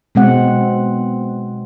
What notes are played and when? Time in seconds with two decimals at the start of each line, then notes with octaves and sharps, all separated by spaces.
0.15 B2 G#3 C4 F#5